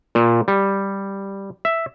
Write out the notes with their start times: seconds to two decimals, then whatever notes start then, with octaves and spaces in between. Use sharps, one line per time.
0.15 A#2
0.48 G3
1.65 E5